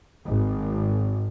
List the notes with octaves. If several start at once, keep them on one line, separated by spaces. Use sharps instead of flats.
G#1